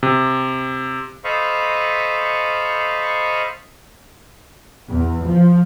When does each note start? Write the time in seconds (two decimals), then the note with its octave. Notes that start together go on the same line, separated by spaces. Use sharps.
0.03 C3
1.24 A4 C5 D#5 F5 B5 C#6
4.90 E2
5.25 F3